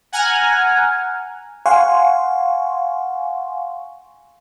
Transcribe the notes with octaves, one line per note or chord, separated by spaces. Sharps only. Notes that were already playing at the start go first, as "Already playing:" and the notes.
F#5 G#5 A#5 F6
F5 F#5 G#5 C6 C#6